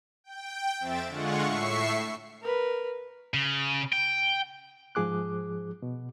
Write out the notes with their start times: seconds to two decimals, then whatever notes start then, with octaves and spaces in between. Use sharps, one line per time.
0.24 G5
0.80 F2 C4 E5 A6 D7 E7
1.09 D3 G#3 F4 F#5 C#6
1.44 A2 E5 C#6 C7
2.42 A#4 B4
3.34 C#3
3.93 G5
4.95 G#2 F3 G#4 D6 F#6
5.82 B2